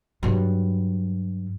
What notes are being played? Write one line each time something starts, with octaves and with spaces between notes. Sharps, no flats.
G2 F#3